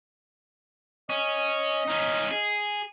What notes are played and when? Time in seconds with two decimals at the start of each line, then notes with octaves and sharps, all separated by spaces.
1.10 C#4 D#5
1.88 C#4 D#4
2.31 G#4